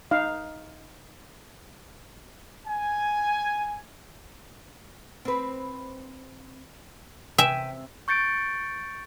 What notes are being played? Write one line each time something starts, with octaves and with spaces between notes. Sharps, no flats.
D#4 F5
G#5
C4 B4
C3 E5 G5 G#5
C#6 G6 A6 C#7 D7